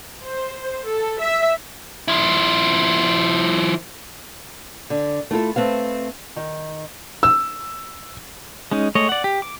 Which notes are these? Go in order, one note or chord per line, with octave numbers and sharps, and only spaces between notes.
C5
A4
E5
F3 E4
D3
A3 E4 F4 A4
A3 C4 B4 F5
D#3
E6
G#3 C#4 D#4
G#3 A3 C#5 D#5
D5 F#5
G4
D6